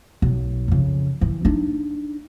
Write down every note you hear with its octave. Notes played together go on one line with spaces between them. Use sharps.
B1
F2 C#3
E3
D4 D#4